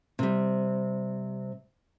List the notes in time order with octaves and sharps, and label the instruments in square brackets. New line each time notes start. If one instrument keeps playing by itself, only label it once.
[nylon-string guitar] C3 G3